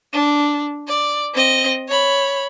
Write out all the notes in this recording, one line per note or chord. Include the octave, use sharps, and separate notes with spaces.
D4
D5
C4 D#5
C#5 B5